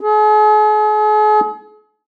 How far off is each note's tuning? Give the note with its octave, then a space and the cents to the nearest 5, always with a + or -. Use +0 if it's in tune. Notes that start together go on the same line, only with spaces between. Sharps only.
G#4 +40